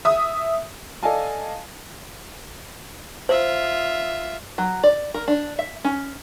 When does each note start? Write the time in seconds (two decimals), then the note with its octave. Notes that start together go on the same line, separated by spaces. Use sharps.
0.05 E5 D#6
1.03 A4 D5 D#5 F5 G#5 A5
3.29 F4 C5 E5
4.58 F#3
4.83 D5
5.14 A#4
5.28 D4
5.59 E5
5.84 C#4